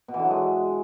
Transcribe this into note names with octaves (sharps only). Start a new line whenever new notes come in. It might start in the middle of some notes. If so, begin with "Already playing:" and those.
B2
E3
D3
F#3
G#3